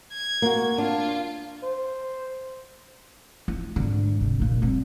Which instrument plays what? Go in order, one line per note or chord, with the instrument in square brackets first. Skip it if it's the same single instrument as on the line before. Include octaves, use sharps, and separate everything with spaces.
[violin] G#6
[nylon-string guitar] A#3 F#4
[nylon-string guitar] D4 [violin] F4
[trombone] C5
[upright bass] E4
G#2 D3
C3
F#1 A#2
G3 C4